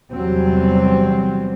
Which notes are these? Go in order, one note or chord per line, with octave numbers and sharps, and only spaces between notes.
E2 C3 F#3 G3 C4